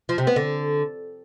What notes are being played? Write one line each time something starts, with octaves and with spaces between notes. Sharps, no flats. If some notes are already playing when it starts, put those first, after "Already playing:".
F3
C3
B3
D3